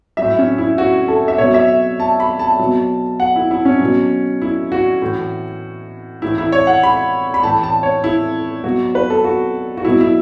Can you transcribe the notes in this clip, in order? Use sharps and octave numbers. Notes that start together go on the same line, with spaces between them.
A2 F#3 E5
C#4
E4
F#4
A4
E5
B2 F#3 C#5
E5
A5
B5
A5
B2 F#3
F#5
E4
E4
C#4
B2 F#3
E4
F#4
A2 E3
A2 E3 E4
E4
C#5
F#5
B5
B5
A2 E3 A5
A5
C#5
E4
B2 F#3 F#4
B4
A4
F#4
F#4
B2 F#3 E4
E4